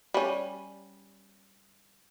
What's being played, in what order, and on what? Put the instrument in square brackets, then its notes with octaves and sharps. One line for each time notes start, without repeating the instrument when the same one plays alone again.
[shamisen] G3 C#4